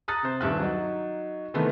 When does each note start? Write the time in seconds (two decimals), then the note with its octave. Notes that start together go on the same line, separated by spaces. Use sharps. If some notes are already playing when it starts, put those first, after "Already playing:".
0.08 A#5 D#6 F#6 A6
0.23 C3 C5
0.41 D#1 G2 E5 F#6
0.59 F#3 D#4
1.54 C3 D#3 E3 A3 B3 C4